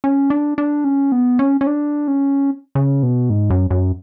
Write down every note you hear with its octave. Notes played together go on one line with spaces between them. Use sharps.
C#4
D4
D4
C#4
B3
C#4
C#4
D4
C#4
C#3
B2
G#2
F#2
F#2